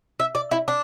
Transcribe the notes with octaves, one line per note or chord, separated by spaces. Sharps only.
E5
D5
E4
D4